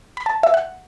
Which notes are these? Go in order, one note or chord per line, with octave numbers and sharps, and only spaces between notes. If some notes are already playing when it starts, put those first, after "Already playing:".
B5
A5
E5
F#5